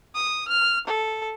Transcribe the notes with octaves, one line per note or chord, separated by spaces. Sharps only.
D#6
F6
A4